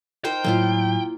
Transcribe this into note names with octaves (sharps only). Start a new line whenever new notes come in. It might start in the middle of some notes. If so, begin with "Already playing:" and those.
D#4 A#4 C5 G5
A2 F#3 A#3 E4 F4